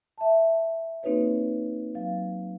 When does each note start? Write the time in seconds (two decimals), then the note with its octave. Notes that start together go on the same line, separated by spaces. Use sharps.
0.18 E5 A5
1.03 A#3 C4 D#4 F#4 B4 C#5
1.95 F#3 F5